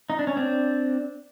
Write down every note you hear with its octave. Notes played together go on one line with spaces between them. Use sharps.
D#4
D4
C#4
C4 D4